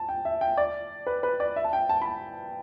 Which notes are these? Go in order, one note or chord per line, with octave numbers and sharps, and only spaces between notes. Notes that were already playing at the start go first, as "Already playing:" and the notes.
Already playing: A5
G5
E5
G5
D5
B4
B4
D5
E5
A5
G5
A5
B5
A5